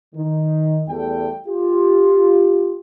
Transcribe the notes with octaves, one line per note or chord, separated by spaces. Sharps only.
D#3
E2 G3 A3 A4 G5
F4 G4